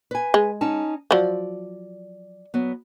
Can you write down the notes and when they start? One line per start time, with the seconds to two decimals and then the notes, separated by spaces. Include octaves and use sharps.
0.11 B4 G#5
0.34 G#3
0.61 C#4 D#4 A5
1.11 F3 F#3 D5
2.54 F#3 B3